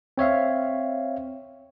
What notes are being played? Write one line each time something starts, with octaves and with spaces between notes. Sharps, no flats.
C4 C#5 E5 F5